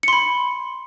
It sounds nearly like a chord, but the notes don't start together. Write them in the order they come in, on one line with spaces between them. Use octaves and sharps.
C#7 C6 B5